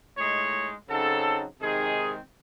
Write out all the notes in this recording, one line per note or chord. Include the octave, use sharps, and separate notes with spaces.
A2 G#3 D#4 C#5
C#3 F#3 C4 D#4 A4
C3 D#3 G#3 C4 D#4 G#4